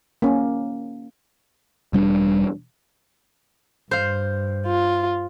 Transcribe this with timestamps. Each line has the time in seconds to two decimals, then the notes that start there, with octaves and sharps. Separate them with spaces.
0.22 A#3 C#4
1.93 E1 G3 C#4 D4
3.91 G2 C5 F5
4.67 F4